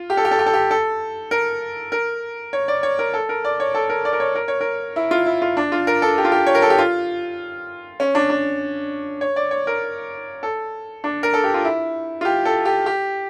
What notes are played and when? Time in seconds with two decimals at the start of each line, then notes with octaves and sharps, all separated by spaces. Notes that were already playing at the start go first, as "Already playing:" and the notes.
Already playing: F4
0.10 G4
0.17 A4
0.25 G4
0.31 A4
0.39 G4
0.46 A4
0.54 G4
0.71 A4
1.31 A#4
1.92 A#4
2.53 C#5
2.68 D5
2.83 C#5
2.99 A#4
3.14 A4
3.29 A#4
3.45 D5
3.60 C#5
3.75 A4
3.89 A#4
4.05 D5
4.13 A#4
4.20 C#5
4.35 A#4
4.48 C#5
4.61 A#4
4.96 E4
5.11 F4
5.26 E4
5.42 F4
5.57 D4
5.72 F4
5.87 A#4
6.02 A4
6.18 G4
6.25 F4
6.32 G4
6.47 C#5
6.55 A#4
6.62 A4
6.70 G4
6.78 F4
8.00 C#4
8.15 D4
8.30 D4
9.21 C#5
9.36 D5
9.51 C#5
9.67 A#4
10.43 A4
11.04 D4
11.23 A#4
11.34 A4
11.44 G4
11.54 F4
11.65 E4
12.21 F4
12.25 G4
12.45 A4
12.65 G4
12.86 G4